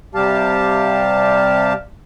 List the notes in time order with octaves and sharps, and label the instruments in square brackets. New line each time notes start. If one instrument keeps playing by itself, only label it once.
[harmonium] C3 G3 G4 F5 A5